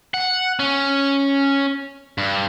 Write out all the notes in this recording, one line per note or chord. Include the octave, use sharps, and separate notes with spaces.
F#5
C#4
G2